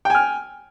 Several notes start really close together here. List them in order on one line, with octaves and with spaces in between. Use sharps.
G5 G#5 F6